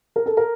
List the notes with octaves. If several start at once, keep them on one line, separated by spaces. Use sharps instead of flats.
A#4
A4
A#4